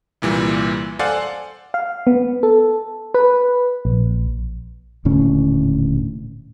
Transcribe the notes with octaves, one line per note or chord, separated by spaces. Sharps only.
C2 A#2 E3 G3
A4 C5 D5 F5 F#5 G#5
F5
B3
A4
B4
A#1
D#1 A2 D3 C#4